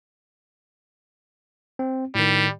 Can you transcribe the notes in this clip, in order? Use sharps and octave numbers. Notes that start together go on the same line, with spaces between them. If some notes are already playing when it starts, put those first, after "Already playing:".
C4
A2 D#3 G3